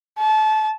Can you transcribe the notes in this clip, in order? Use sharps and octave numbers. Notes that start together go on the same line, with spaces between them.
A5